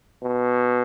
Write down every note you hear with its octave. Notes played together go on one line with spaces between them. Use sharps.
B2